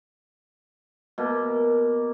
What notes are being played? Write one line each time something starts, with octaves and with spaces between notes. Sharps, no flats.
B2 A#3